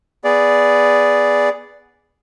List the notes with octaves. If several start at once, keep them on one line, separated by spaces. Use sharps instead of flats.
B3 G#4 D5